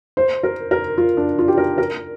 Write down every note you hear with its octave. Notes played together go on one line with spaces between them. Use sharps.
C5
A#4
A#4
F4
D4
F4
G4
A#4
A#4